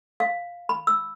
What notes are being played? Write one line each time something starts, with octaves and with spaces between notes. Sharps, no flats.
F5
B5
E6